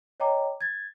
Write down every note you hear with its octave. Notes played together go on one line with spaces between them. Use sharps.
C#5 D#5 G5 A#5 D6
G#6 A6